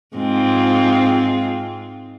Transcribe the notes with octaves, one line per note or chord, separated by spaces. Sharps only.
G#2 C4 F4